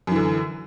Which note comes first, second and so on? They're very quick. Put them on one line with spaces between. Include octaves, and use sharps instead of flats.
F#2 E3 D3